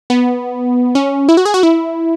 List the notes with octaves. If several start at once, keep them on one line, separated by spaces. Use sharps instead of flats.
B3
C#4
E4
F#4
G#4
F#4
E4